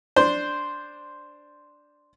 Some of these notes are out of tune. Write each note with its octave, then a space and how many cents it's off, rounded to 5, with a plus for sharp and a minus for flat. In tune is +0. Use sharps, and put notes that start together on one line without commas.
D4 +0 C5 +0